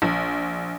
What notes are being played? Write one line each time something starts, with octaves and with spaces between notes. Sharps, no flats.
A#1